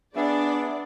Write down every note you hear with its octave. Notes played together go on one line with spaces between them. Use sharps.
B3 D4 G#4 D5 E5